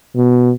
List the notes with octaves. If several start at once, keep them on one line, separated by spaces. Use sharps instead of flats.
B2